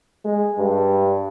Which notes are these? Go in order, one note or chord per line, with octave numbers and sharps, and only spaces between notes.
G#3
G2